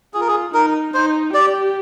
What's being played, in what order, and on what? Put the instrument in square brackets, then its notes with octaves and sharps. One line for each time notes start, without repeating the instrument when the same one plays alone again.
[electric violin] F4 [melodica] G#4
[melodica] A#4
G#4
[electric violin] D#4 [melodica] A#4
[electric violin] D#4 [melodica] C5
[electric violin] G4 [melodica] D5